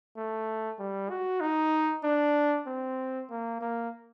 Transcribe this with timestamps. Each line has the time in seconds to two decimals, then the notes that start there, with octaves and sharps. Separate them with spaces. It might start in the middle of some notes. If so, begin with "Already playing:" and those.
0.16 A3
0.79 G3
1.10 F#4
1.41 D#4
2.03 D4
2.66 C4
3.30 A#3
3.61 A#3